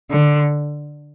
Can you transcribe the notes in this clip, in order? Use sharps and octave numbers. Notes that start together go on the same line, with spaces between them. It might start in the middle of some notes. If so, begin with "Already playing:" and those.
D3